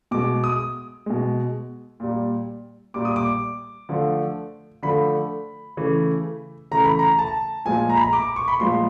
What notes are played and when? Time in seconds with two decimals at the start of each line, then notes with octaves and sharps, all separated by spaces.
0.11 B2 G#3 D6
0.44 D#6
1.06 B2 G#3
2.00 A#2 G3
2.94 A#2 G3 D6
3.05 D#6
3.16 D6
3.89 D3 F3 A3
4.83 D3 F3 A3 B5
5.77 C#3 E3 A3
6.71 C#3 E3 A3 A#5
6.85 B5
6.99 A#5
7.19 A5
7.65 A#2 F3 G#3 G#5
7.90 A#5
7.96 B5
8.04 A#5
8.13 D6
8.36 C#6
8.48 B5
8.60 A#2 F3 G#3 C6